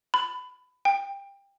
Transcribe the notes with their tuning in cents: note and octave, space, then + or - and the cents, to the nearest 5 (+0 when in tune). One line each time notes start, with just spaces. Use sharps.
B5 +20
G5 +25